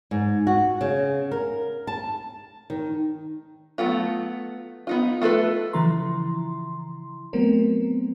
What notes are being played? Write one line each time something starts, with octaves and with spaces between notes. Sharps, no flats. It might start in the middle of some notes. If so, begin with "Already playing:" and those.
G#2
F#4
C#3
A#4
A5
D#3
F#3 A3 B3 F4
B3 D#4 F4
A3 F4 A4 B4
C#3 E3 F3 E4 A#5 C6
F#3 A3 B3 C4 A#4